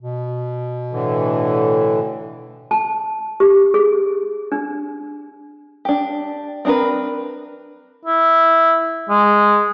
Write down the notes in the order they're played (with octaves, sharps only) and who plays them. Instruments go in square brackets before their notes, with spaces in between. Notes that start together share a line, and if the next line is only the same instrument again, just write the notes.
[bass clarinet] B2
[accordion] A2 D3 E3
[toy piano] A5
G4
G#4
D4
[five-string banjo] D4 G4
C4 D4 G#4 A#4 B4
[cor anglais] E4
G#3